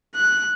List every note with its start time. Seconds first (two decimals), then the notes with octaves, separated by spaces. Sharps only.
0.15 F#6